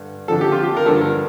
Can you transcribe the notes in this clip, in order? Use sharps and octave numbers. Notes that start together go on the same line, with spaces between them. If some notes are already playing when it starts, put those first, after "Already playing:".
Already playing: G2 D3
F2 D3 F3 A4
G4
F4
G4
A#4
G2 D3 F3 A4
A#4